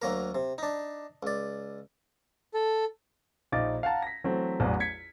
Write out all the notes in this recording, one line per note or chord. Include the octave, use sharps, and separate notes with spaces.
D2 F#3 A#3 A#4
C3
D4 D#4
C#2 D5
A4
A#1 D#4 F5 D6 A6
F5 F#5 A5 A#5
A#6 B6
E3 F#3 A3 C4
A1 E2 F#3 D5
G#6 B6 C#7